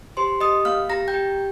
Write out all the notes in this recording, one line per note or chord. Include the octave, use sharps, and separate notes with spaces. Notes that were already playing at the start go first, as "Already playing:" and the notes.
G4 C5 C6
G4 D#5 D#6
A#3 F5 F6
G4 A#5 A#6
G5 G6
G4